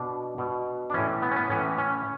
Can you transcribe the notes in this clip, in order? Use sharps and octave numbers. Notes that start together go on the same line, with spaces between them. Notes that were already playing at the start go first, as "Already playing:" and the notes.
Already playing: B2 D4
B2
D4
A2 E3 C#4
B3
C#4
B3
A2 E3 C#4
C#4